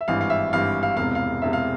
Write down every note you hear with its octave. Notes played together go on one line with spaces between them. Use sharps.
E5
G#1 G2 E3 F5
F5
E5
G#1 G2 E3 F5
F5
E1 E2 C3 F5
F5
E1 E2 C3 E5
F5